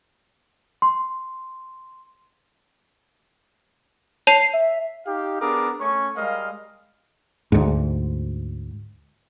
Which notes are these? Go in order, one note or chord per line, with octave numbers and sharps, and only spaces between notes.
C6
C#5 A5 C7 F7
E5
D#4 G4 F5
B3 D4 G#4 A#4 D6 D#6
A3 C#4 C#6
G3 G#3 A#4 D#5 F5
D2 G#2